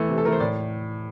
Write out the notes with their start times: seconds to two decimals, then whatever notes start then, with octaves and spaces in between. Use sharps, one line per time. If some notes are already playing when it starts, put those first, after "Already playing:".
Already playing: E3 A3
0.09 C3
0.18 A4
0.24 E3 A3 A#4
0.33 C5
0.40 A2 D5